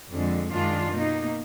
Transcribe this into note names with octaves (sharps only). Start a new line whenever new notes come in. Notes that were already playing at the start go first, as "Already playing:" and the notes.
F2 D3 G#3
F#2 D#3 G#3 D4 F4
B2 A#3 D#4